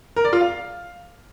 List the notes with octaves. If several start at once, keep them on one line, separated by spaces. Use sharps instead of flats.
A#4
D5
F4
F5